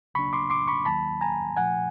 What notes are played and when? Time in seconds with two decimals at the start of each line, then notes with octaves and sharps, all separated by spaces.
0.14 D2 C#3 F#3 A#3 D4 B5 C#6
0.33 C6 D6
0.50 C6 D6
0.68 B5 C#6
0.85 D#2 D#3 F#3 A#3 A5 B5
1.21 G#5 A#5
1.56 A#2 F3 A3 F#5 G#5